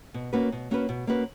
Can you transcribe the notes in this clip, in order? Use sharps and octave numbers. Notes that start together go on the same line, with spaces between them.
B2
A#3 C#4 F#4 B4
B2
A#3 C#4 F#4 B4
B2
A#3 C#4 F#4 B4